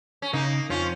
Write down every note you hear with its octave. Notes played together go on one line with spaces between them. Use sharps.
C#4
C#3 A#3 D#4
F2 F3 C#4 F4